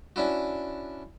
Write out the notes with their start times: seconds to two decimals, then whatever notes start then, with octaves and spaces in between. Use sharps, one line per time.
0.16 C#4 D4 E4 F#4